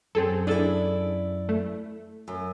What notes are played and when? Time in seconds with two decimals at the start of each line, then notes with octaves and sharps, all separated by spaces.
0.15 F#2 C4 C#4 G#4 A4
0.47 D4 E4 G#4 A4 D5
1.49 A3
2.28 F#2